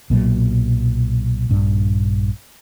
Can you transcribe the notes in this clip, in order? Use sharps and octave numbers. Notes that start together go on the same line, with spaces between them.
B1 A#2 C#3 F#3
A#1 G2